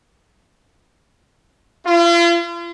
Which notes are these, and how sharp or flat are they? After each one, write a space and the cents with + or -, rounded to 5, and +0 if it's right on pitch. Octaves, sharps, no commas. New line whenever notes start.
F4 -40